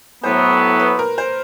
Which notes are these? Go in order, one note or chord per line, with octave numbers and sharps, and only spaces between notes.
A2 F#3 B3 C5
B4
A#4
C5